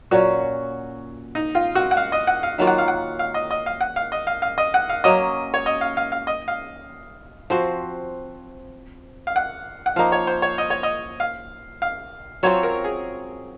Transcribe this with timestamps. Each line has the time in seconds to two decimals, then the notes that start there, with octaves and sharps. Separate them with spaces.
0.11 A#2 F#3 C#4 F#4
1.35 D#4
1.55 F4
1.75 F#4
1.91 F#5
1.97 F5
2.12 D#5
2.27 F#5
2.43 F5
2.58 D#3 F#3 A#3 F4
2.67 F#5
2.78 F5
2.88 F#5
3.19 F5
3.34 D#5
3.51 D#5
3.66 F5
3.81 F#5
3.96 F5
4.12 D#5
4.27 F5
4.42 F5
4.58 D#5
4.74 F#5
4.89 F5
5.04 F#3 A#3 C#4 D#5
5.54 C#5
5.66 D#5
5.81 F5
5.97 F5
6.12 F5
6.27 D#5
6.48 F5
7.50 F3 C4 F#4 C5
9.27 F5
9.36 F#5
9.86 F#5
9.96 F3 A#3 D#4 F5
10.12 C#5
10.27 C5
10.42 C#5
10.58 D#5
10.70 C#5
10.83 D#5
11.20 F5
11.82 F5
12.43 F#3 C4 F4 C#5
12.63 A#4
12.84 G#4